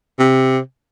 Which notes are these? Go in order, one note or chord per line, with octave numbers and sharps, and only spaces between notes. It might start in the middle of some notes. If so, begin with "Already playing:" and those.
C3